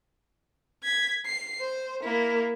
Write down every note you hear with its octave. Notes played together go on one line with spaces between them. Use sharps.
G#6 B6
C7
C5
A#3 E4